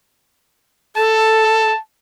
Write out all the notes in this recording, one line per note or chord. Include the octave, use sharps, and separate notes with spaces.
A4 A5